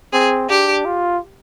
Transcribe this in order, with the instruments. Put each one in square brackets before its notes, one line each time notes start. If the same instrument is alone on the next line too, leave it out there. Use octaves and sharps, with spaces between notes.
[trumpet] C4 [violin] G#4
[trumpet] D4 [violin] G4
[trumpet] F4